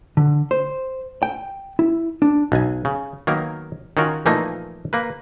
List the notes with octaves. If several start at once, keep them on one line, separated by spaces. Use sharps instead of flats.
D3
C5
G5
E4
D4
B1 G#5
C#3
D#3 F#3 A#3 B3 A#4
D#3 C#4 F4 F#4 A#4
A#2 E3 F3 A3 A#3 D#4
A#3 B4